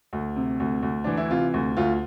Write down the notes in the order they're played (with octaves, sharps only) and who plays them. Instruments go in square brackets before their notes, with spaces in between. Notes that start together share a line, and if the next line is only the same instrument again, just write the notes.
[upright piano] D2
C3
D2
D2
E3 D4
E4
C3 F4
D2
D2 F4